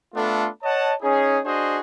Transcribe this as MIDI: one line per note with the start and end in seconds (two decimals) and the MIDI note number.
0.15 0.48 57
0.15 0.48 59
0.15 0.48 62
0.15 0.48 65
0.15 0.48 69
0.63 0.94 73
0.63 0.94 75
0.63 0.94 78
0.63 0.94 81
1.02 1.40 61
1.02 1.40 63
1.02 1.40 68
1.45 1.80 62
1.45 1.80 66
1.45 1.80 68
1.45 1.80 72
1.45 1.80 75